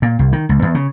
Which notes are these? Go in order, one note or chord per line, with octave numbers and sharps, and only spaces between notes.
A#2
C2
D#3
C#2
E2
C#3